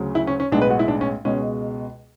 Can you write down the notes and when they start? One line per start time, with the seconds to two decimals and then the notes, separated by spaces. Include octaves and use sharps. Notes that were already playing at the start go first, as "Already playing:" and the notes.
Already playing: D2 C#3 F#3
0.15 E4
0.27 C#4
0.40 C#4
0.52 B1 A2 G#3 B3 D4
0.61 B4
0.70 F#4
0.79 E4
0.88 D4
1.01 C#4
1.25 C#2 B2 G#3 C#4